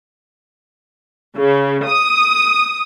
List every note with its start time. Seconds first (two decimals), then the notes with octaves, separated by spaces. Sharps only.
1.35 C#3
1.87 D#6